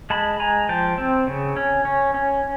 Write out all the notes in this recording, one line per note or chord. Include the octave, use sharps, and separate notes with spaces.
G#3 A5 B5
G#3 G#5 A#5
F3 G5 A5
C4
C#3
C#4
C#4
C#4